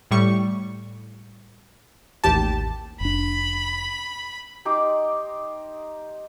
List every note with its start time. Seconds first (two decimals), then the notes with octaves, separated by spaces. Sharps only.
0.11 A2 G3 C#6
2.24 A1 D#2 G4 A5
3.01 F1 D4 B5
4.65 D#4 G4 C6 D6